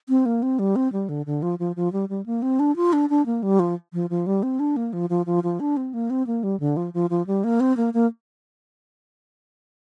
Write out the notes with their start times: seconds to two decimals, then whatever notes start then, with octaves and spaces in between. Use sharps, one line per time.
0.09 C4
0.26 A#3
0.43 C4
0.59 G3
0.76 C4
0.93 G3
1.09 D3
1.26 D3
1.42 F3
1.59 F3
1.76 F3
1.93 G3
2.09 G3
2.26 A#3
2.42 C4
2.60 D4
2.76 F4
2.93 D4
3.10 D4
3.26 A#3
3.43 G3
3.59 F3
3.93 F3
4.10 F3
4.27 G3
4.43 C4
4.60 D4
4.76 A#3
4.93 F3
5.10 F3
5.26 F3
5.44 F3
5.60 D4
5.77 C4
5.94 A#3
6.10 C4
6.27 A#3
6.43 G3
6.60 D3
6.77 F3
6.94 F3
7.10 F3
7.27 G3
7.44 A#3
7.60 C4
7.77 A#3
7.94 A#3